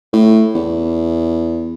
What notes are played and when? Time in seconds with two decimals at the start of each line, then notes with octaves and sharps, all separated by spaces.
0.13 A2
0.55 E2